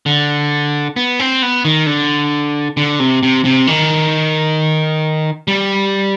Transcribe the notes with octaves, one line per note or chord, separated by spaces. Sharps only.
D3
B3
C4
B3
D#3
D3
D3
C3
C3
C3
D#3
G3